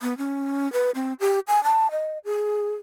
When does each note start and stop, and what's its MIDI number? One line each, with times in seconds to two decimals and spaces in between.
0.02 0.16 59
0.18 0.71 61
0.73 0.91 71
0.95 1.13 60
1.20 1.39 67
1.48 1.63 80
1.64 1.90 81
1.91 2.18 75
2.25 2.74 68